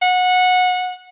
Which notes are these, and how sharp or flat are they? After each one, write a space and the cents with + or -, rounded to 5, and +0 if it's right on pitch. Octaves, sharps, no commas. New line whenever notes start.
F#5 -20